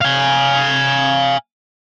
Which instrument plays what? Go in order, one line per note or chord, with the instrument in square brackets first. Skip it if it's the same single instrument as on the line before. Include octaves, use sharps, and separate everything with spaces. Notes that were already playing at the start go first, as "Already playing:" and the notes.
[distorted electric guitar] F5 G#5